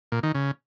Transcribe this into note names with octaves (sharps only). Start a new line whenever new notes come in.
A#2
D#3
C#3